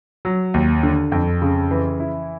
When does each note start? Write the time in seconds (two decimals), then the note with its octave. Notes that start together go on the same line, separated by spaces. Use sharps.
0.25 F#3
0.54 D#2
0.83 D3
1.12 F2
1.42 C#3
1.71 E3
2.00 E4